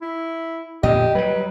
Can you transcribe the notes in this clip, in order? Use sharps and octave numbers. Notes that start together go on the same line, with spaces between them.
E4
F2 A#2 D3 G4 D#5
F#3 G3 B4